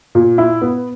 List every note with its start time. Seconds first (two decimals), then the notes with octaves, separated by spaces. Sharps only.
0.15 A#2
0.38 E4
0.62 B3